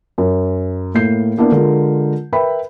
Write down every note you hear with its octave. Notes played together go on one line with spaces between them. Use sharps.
F#2
A2 A#3 G6 C7
A#3 B3 D4 E4 A#4 D5
D3 G#3 F4 A#4
A#4 B4 E5 G5 B5